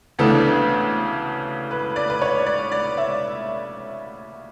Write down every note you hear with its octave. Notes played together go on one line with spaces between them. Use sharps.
D2 C#3 E3 B3 D4 A4
B4
D5
B4
C#5
D5
D5
E5